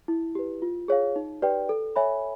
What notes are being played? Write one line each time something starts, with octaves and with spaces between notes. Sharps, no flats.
E4
G4 B4
F4
G#4 C#5 F5
D#4
G4 B4 D5 G5
A4
C#5 E5 G#5 B5